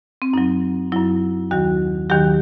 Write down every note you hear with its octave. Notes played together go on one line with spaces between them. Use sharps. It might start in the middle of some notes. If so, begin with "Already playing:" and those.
C4
F#2 F#3 D#4
F#2 F#3 E4
D#2 D#3 F#3 F#4
D#2 D#3 F#3 G4